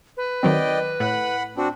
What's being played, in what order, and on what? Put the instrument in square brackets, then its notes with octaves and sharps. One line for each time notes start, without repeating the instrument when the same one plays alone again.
[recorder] B4
[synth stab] D#3 F#3 C4 [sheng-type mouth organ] D5 D#5 G5
[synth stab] A2 [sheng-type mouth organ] F#5 B5
[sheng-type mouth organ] C4 D4 [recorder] F#4